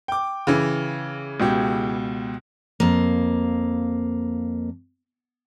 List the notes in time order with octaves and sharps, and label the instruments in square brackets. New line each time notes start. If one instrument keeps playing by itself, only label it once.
[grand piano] G5 D6
[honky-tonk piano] C#3 E3
[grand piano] C#2 B2 G4
[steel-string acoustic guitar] F2 A#3